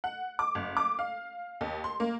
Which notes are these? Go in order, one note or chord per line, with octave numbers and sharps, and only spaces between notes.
F#5
D6
F#1
D6
F5
D#2
C6
A#3